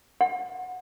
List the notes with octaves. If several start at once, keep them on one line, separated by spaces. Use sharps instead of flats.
F#5